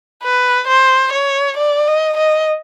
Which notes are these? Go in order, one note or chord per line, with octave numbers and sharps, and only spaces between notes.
B4
C5
C#5
D5
D#5
D#5